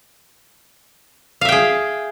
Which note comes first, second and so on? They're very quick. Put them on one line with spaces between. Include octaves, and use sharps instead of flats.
F5 E5 G5 G#4